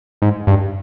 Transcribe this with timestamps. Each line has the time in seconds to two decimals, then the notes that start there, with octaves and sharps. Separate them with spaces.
0.22 G#2
0.47 G2